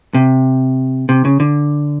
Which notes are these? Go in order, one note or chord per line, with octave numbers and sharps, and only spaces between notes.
C3
C3
C#3
D3